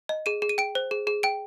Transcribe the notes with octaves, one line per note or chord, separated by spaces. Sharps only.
D#5
G#4 D#7
G#4
D#7
G5 D7
C5
G#4
G#4
G5 D7